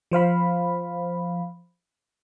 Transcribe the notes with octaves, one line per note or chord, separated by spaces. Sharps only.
F3 C5 F5 B5